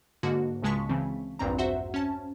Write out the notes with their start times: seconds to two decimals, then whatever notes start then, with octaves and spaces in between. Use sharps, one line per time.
0.23 G#2 D3 A#3 F#4
0.62 C#2 C#3 G#3 A5 C#6 B6
0.89 C#3 E3 C4
1.39 A#1 E2 G2 C4 A#5
1.58 F#4 C5 E5 F#5
1.94 C#4 A5